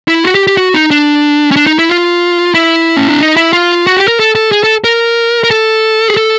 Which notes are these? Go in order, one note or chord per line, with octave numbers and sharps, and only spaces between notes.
E4
F#4
G4
G4
F#4
D#4
D4
C#4
D4
D#4
E4
F4
E4
C#4
D4
D#4
E4
F4
F#4
G4
A#4
A4
A4
G#4
A4
A#4
A#4
A4
G#4
A4